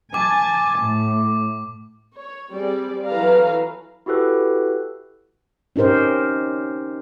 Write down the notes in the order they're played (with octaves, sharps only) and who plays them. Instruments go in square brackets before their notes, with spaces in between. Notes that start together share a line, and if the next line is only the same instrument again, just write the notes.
[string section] G#5 A5 A6 [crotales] D6
[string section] A2
[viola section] C#5
G3 C4 G#4 D5
E3 F#3 A4 B4 F5 A#5
[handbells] E4 F#4 G4 A4 B4
[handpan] C#4 D#4 G4 A#4 C5